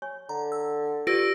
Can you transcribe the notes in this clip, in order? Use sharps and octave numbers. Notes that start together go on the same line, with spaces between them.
C#5 G#5 C#6
D3 A#5
E6
F4 G4 B4 D5 E6 A#6 D7